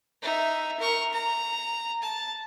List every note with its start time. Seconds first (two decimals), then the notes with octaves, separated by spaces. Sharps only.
0.22 D#4 E5
0.79 A#4 C#6
1.13 A#5
2.02 A5